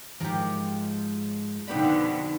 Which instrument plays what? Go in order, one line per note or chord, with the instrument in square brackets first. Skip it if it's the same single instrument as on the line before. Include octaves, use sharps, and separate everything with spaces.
[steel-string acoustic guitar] G#2 F3 G#3 [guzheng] G4 A#4
[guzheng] F2 G4 B5 [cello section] B2 D3 B3 [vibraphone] D#4 D5